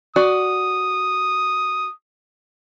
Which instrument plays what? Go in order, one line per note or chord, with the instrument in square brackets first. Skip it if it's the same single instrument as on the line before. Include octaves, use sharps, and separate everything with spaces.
[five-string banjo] F#4 D5 [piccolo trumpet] D#6